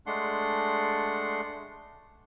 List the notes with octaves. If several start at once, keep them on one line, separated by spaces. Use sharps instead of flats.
G#3 A3 D4 F#5 C6